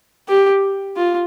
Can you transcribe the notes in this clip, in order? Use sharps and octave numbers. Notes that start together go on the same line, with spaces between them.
G4
F4